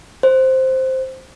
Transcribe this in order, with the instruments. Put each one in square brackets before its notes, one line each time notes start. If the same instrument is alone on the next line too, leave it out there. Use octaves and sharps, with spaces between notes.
[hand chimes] C5